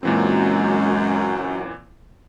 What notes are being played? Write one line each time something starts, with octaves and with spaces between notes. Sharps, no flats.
F#2 A#2 E3 G#3 C4